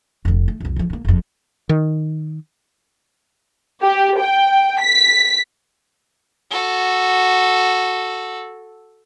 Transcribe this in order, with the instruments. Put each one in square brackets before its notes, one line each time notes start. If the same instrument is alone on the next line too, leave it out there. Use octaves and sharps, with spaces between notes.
[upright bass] F1 D3
A3
C2 F2
D3 F3
G2 A#3
F#1 F2
[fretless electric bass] D#3
[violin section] G4
G5
B6
[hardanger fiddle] F#4 A4